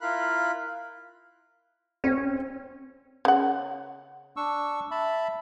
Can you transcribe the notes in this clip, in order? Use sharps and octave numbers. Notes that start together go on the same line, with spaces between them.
E4 F4 A#4 F5 B5 F#6
C4 C#4 C5
C#3 F#5
D4 C#6 E6
E5 A5 B5